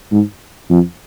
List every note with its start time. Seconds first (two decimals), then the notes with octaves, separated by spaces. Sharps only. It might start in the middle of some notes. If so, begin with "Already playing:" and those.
0.12 G#2
0.70 F2